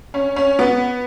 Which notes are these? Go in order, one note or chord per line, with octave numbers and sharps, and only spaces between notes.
C#4
C#4
B3